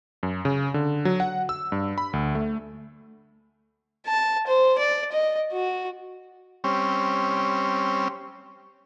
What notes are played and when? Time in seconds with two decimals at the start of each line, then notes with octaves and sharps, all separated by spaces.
0.23 F#2
0.45 C#3
0.74 D3
1.05 F#3
1.20 F#5
1.49 E6
1.72 G2
1.98 B5
2.13 D2
2.35 A3
4.07 A5
4.47 C5
4.78 D5
5.12 D#5
5.52 F#4
6.64 G3 C4 C#4